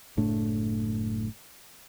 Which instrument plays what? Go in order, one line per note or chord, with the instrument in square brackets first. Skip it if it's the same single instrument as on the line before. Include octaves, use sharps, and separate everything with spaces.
[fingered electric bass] F#1 A2 A3 D4